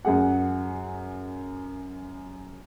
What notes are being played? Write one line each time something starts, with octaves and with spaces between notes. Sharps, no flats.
F#2 G#4 F#5